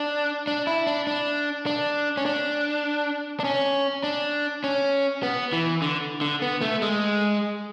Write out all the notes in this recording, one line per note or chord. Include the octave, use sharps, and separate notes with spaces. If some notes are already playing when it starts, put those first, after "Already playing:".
Already playing: D4
D4
E4
D4
D4
D4
C#4
D4
D4
C#4
D4
C#4
B3
E3
D3
D3
B3
A3
G#3